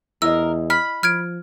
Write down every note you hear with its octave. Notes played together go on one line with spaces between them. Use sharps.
E2 E4 G#4 A#4 D#5 E6
B5 F6
F3 F6 G#6 D7